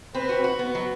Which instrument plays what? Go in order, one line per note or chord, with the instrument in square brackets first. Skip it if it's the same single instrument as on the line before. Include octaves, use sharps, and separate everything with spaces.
[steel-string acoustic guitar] C4 [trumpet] B4
[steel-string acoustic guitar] F#4
F#4
B3
F#3